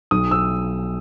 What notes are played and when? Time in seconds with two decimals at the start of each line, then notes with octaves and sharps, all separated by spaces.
0.11 B1 D#6
0.31 E6